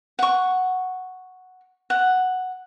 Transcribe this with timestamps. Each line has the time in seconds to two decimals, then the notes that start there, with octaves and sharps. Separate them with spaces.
0.19 F#5 C#6
1.90 F#5